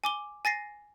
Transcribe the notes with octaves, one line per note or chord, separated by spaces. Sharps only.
G#5 D6 G7
G#5 A6 A#6 C7